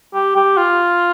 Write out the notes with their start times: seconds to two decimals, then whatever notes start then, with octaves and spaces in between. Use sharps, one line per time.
0.14 G4
0.35 G4
0.57 F4